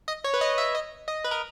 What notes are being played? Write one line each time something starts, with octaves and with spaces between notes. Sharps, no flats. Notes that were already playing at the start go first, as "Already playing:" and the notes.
D#5
C#5
B4
D#5
E5
D#5
D#5
B4
A#4